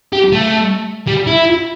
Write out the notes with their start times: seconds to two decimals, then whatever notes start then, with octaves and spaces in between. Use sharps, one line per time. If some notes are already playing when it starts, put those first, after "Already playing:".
0.13 G4
0.32 A3
1.07 G3
1.27 E4